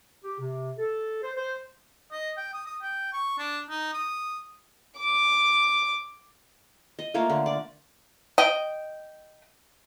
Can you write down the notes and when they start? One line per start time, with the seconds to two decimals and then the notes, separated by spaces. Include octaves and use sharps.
0.24 G4
0.40 C3
0.79 A4
1.23 C5
1.37 C5
2.11 D#5
2.37 G5
2.53 D#6
2.66 D#6
2.82 G5
3.13 C#6
3.38 D4
3.70 D#4
3.94 D#6
4.98 D6
6.99 D#5
7.14 A3 A#3 F4 C#5
7.30 D3
7.46 D5
8.38 D#5 G5